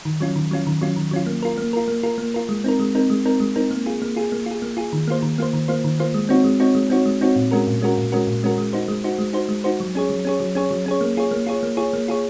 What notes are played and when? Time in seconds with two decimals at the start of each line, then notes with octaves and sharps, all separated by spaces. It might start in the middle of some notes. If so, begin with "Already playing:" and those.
0.05 D#3
0.20 F#3 C#4 F4
0.36 D#3
0.51 F#3 C#4 F4
0.67 D#3
0.81 F#3 C#4 F4
0.96 D#3
1.11 F#3 C#4 F4
1.27 A#3
1.43 F4 A#4
1.58 A#3
1.73 F4 A#4
1.88 A#3
2.03 F4 A#4
2.18 A#3
2.34 F4 A#4
2.49 G#3
2.64 C4 D#4 A#4
2.80 G#3
2.95 C4 D#4 A#4
3.10 G#3
3.25 C4 D#4 A#4
3.40 G#3
3.56 C4 D#4 A#4
3.71 A#3
3.86 F4 G#4
4.02 A#3
4.16 F4 G#4
4.32 A#3
4.46 F4
4.51 G#4
4.62 A#3
4.77 F4 G#4
4.93 D#3
5.08 A#3 F4 C5
5.22 D#3
5.38 A#3 F4 C5
5.53 D#3
5.68 A#3 F4 C5
5.84 D#3
6.00 A#3 F4 C5
6.14 G#3
6.29 C4 D#4 F#4 C#5
6.44 G#3
6.60 C4 D#4 F#4 C#5
6.75 G#3
6.90 C4 D#4 F#4 C#5
7.06 G#3
7.21 C4 D#4 F#4 C#5
7.36 A#2
7.51 G#3 C#4 F#4 A#4
7.67 A#2
7.82 G#3 C#4 F#4 A#4
7.98 A#2
8.12 G#3 C#4 F#4 A#4
8.27 A#2
8.43 G#3 C#4 F#4 A#4
8.58 G#3
8.73 D#4 F#4 C5
8.88 G#3
9.04 D#4 F#4 C5
9.18 G#3
9.33 D#4 F#4 C5
9.49 G#3
9.64 D#4 F#4 C5
9.80 F#3
9.95 C#4 G#4 C#5
10.10 F#3
10.25 C#4 G#4 C#5
10.40 F#3
10.55 C#4 G#4 C#5
10.71 F#3
10.86 C#4 G#4 C#5
11.01 A#3
11.17 F4 G#4 C#5
11.31 A#3
11.47 F4 G#4 C#5
11.63 A#3
11.77 F4 G#4 C#5
11.93 A#3
12.08 F4 G#4 C#5